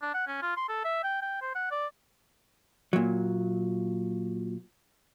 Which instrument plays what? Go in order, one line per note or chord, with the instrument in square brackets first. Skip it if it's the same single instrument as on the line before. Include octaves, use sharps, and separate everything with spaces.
[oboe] D4
F#5
C#4
F4
C6
A4
E5
G5
G5
C5
F#5
D5
[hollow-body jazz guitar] A#2 F#3